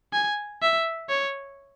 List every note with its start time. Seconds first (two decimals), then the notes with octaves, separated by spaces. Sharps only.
0.13 G#5
0.62 E5
1.09 C#5